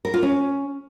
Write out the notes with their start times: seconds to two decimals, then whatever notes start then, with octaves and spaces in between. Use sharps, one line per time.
0.05 A#4
0.14 F4
0.23 C#4